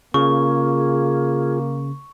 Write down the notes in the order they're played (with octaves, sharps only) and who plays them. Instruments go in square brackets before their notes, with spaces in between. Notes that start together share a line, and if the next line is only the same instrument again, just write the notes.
[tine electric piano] C#3 [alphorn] A#3 [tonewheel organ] F4 G#4 [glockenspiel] C#6